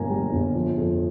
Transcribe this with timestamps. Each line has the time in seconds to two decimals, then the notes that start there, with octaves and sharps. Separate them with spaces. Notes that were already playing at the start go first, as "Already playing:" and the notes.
Already playing: G1 G2 A#3 G#5 A#5
0.10 G3
0.32 G1
0.55 F3
0.77 F2